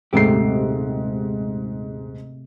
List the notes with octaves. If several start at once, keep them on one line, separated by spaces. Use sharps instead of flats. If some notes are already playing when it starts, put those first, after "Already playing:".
D#1 G#2 C3 A3 G4 C7